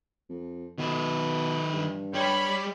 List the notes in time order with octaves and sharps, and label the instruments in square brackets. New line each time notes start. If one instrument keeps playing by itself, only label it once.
[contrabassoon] F2
[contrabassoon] B2 [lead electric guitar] D#3 B4
[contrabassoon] G2
[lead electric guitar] G3 G4 [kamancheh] C#5 B5